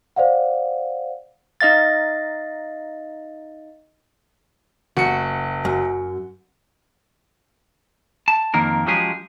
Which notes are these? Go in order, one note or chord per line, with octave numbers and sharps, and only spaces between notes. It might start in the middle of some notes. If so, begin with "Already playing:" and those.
C5 D5 F5 F#5
D#4 D#5 F5 A6
F#1 F#4 C#7
F#2
A5
F2 D#3 A#3 A#4
F3 F#3 G#3 C#4 G4 G#4